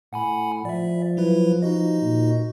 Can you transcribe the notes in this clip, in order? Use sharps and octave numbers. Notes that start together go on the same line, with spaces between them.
A2 F#5 G#5 B5
F3 D5 E5
F#3 E4 B4
D#4 F#4 D#5
A#2